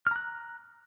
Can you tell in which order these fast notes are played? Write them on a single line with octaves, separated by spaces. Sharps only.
F6 A#5 F#6